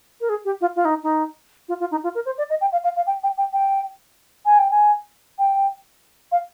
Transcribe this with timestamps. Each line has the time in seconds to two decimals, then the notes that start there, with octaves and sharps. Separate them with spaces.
0.21 A#4
0.29 G#4
0.45 G4
0.61 F4
0.76 F4
0.85 D#4
1.03 D#4
1.69 F4
1.80 F4
1.91 D#4
2.04 F4
2.15 A#4
2.26 C5
2.38 D5
2.50 D#5
2.61 G5
2.72 F5
2.84 F5
2.96 F5
3.07 G5
3.23 G5
3.38 G5
3.53 G5
4.46 G#5
4.59 G5
4.71 G#5
5.39 G5
6.32 F5